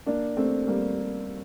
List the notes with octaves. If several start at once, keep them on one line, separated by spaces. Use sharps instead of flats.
A#3 D4
A3 C4
G3 A#3